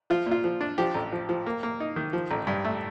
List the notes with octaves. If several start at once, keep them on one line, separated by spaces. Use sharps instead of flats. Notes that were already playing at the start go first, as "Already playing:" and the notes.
F3 F4
A#2
F4
F3
D4
F3 G4
A1
F3
F3
A#3
A#3
D#4
D#3
F3
A1
G2
A3